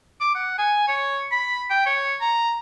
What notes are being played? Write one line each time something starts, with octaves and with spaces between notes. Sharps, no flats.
D6
F#5
G#5
C#5
B5
G5
C#5
A#5